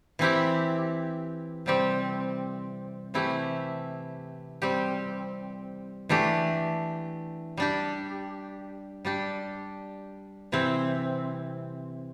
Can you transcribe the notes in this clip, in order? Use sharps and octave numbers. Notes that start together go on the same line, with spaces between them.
E3 C4 E4 G4
C3 G3 C4 G4
C3 E3 A3 E4 G4
G3 C4 G4
E3 A3 D4 G4
G3 D4 G4
G3 D4 G4
C3 E3 C4 E4